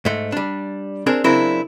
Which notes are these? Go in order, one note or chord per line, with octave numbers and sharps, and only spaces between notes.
G#2 A3
G3 D4
C4 D4 G#4 A#4
C#3 F#3 C4 D4 E4 A#4